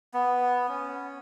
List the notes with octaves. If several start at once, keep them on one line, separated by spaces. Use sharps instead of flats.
B3
C#4